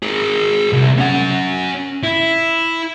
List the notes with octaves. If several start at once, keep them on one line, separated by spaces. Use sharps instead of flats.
G#4 A#4
C2
C#4 F#5
E4